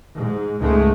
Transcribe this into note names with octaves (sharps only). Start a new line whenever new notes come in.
G#2
C#2 G#2 G#3 A3